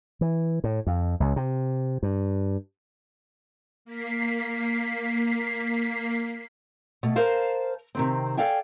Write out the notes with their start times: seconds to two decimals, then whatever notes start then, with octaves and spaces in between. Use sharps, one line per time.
0.21 E3
0.64 A2
0.87 F2
1.20 C#2
1.36 C3
2.03 G2
3.85 A#3 B6 C7
7.03 B2 A3
7.16 A#4 C5 F5 A5
7.95 C3 D#3 C4
8.37 A4 D5 F5 G5 G#5